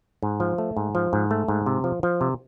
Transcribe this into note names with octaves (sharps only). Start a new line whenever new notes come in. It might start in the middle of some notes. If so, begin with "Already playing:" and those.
G#2
F3
A3
G#2
F3
G#2
A3
G#2
C3
F3
F3
C3